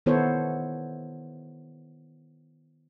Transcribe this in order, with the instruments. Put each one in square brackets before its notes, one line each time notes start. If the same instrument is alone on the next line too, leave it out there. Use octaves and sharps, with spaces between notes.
[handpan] D#3 B3 E4 A4 C5 C#5